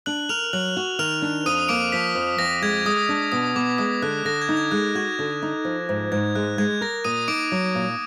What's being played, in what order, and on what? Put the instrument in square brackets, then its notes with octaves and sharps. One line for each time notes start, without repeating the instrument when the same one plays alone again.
[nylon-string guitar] D4 [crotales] F#6 F#7
[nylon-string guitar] A#4 [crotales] F6 F7
[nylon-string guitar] F#3 [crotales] F#6 F#7
[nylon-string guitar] F#4
[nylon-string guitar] D#3 [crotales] F6 F7
[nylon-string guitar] D4
[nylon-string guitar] F2 [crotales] D#6 D#7
[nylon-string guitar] A#3 [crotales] D6 D7
[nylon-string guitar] F3 [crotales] B6
[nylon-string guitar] F2
[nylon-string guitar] F2 [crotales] A#6
[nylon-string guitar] G#3 [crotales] G#6
[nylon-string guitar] G#3 [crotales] D#6
[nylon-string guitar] D4
[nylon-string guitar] B2 [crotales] D#6
[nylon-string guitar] B3 [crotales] D6
[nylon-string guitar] G#3 [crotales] D#6
[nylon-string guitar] D3 [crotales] F#6
[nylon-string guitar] D3 [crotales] A#6
[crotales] G#6
[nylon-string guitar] D#4
[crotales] G#6
[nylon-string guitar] G#3 [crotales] F#6
[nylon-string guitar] F#4 [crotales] G#6
[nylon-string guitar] D3
D#4
F3
G#2
[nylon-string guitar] G#2 [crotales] G#6
[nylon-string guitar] G#3 [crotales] F#6
[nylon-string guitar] G#3 [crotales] G#6
[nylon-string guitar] A#4 [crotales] A#6
[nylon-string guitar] A#2 [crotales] D#6 D#7
[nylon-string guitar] D#4 [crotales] D6 D7
[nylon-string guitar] F#3
A#2